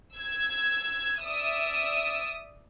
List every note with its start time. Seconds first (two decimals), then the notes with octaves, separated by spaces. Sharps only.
0.15 E6 G#6
1.21 D5 E5 D#6 E6